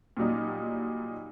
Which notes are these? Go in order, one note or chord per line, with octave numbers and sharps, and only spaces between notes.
A#2 F#3 G3 D#4